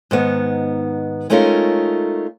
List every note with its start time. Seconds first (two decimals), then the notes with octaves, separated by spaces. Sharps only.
0.11 G#2 D#3 B3
1.30 G#3 A3 C#4 D#4 F4 A#4